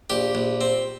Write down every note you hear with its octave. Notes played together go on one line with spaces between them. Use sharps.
A#1 G4
A#1
C4